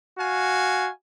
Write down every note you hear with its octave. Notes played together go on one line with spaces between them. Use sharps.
F#4 F5 G#5